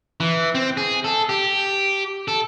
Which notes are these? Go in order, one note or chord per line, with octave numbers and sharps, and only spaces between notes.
E3
C4
G#4
A4
G4
A4